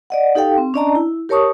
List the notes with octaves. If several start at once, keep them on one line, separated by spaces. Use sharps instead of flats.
D5 D#5 F#5
D#4 G4 A4 F5 G5
C4
C#4 D4 D5 D#5 A5 A#5
E4
G4 A#4 C#5 A5 C#6 D#6